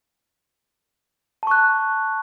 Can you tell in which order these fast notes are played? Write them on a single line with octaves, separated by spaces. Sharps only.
A5 C#6 F#6